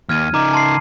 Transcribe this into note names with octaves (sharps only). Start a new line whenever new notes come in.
D#2 F6 G#6 D#7
C#3 D#4 A#5 D6 G#6
A5 C6 C7